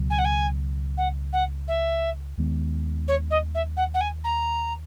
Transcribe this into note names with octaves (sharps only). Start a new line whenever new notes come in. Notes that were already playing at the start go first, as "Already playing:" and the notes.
Already playing: C#2 B2 F#3
G#5
F#5
G#5
F#5
F#5
E5
D#2 D#3 G#3 B3
C#5
D#5
E5
F#5
F#5
G#5
A#5